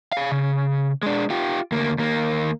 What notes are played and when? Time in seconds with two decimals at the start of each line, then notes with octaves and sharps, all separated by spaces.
0.12 G#4 F5
0.32 C#3
1.03 G#3 D4
1.30 F4 G4
1.72 D2 A#3
1.98 D#2 A#3